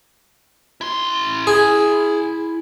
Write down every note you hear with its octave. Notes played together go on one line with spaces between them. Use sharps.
E4 C6
G#4